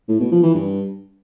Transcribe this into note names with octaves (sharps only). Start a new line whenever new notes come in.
A2
B2
F3
E3
G2